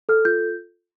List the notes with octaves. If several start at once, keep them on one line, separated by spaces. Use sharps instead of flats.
A4 F6
F4 G6